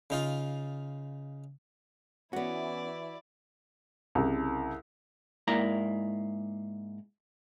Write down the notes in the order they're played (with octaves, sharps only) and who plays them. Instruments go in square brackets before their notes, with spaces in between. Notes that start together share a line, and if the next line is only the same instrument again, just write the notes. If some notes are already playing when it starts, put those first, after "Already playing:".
[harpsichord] C#3 D#4 F4
[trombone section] E3 [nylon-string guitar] B3 C#4 [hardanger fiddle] E4 D5 [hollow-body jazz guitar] F#4
[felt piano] C2 C#3
[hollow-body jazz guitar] G#2 A#3 E4 D5 A#5